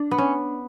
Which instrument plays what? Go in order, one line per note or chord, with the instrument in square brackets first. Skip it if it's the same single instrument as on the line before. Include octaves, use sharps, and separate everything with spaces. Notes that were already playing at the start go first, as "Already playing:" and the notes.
Already playing: [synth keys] D4
[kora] B3
C#4